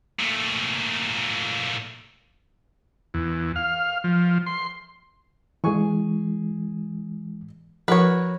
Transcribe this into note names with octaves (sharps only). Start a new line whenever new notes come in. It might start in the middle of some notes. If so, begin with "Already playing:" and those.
A#2 A3
E2
F5
F3
C6
E3 G#3 G#4 G#5 C#6
F3 F#4 A#4 B4 C#5